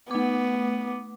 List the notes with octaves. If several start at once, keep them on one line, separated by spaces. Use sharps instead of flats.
A3 B3 D6